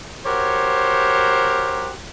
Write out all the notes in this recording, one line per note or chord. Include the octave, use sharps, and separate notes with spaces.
F#4 G4 A#4 C5 C#5